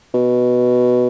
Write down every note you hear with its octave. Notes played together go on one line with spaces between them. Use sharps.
B2